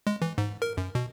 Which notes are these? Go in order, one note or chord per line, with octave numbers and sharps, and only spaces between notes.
G#3
E3
G#2
A#4
F#2
B2